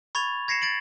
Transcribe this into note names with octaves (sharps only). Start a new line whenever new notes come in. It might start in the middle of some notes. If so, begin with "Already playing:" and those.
B5 C#6 G#6 A6 F7
G#6 A#6 C7 C#7 E7
G#6 A6 D7 F#7